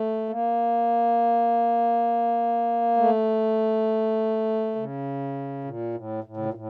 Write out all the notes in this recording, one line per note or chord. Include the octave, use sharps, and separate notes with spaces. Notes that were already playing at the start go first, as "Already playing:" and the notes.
Already playing: A3
A#3
A3
C#3
A#2
A2
A2
C#3
A#2
A2